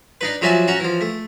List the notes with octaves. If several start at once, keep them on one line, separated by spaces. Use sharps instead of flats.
D4 D#4 B4
F3 F#3 F#4 E5 G#5 A5
C#4 F#4 A#5
E3 F3
A3